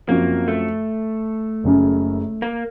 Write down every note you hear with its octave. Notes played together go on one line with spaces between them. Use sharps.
F#2 F3 A#3 C4 F#4
A3
F#1 F#2 C#3
A#3